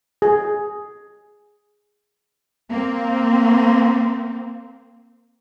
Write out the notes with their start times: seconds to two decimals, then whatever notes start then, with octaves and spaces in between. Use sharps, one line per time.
0.22 G#4
2.69 A#3 C4